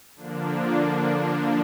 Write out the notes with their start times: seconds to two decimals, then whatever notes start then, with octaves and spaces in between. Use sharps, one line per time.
0.15 D3 F3 A#3 D4